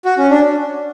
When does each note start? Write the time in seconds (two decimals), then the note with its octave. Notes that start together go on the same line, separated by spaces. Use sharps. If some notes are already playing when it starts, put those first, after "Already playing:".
0.05 F#4
0.18 C#4
0.31 D4